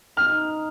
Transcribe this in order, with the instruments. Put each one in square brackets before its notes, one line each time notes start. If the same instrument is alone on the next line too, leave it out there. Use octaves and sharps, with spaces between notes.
[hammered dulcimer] D#4 [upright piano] F6